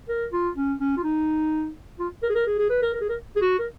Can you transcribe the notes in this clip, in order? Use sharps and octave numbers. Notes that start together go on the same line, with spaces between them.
A#4
F4
C#4
C#4
F4
D#4
F4
A#4
G#4
A#4
G#4
G#4
B4
A#4
A#4
G#4
A#4
G#4
F#4
A#4